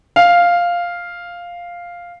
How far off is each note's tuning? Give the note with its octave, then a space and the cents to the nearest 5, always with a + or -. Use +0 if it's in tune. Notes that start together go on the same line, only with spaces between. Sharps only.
F5 +0